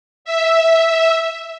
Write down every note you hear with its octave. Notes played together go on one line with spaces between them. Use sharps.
E5